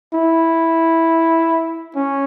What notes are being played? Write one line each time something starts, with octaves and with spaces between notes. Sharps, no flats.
E4
C#4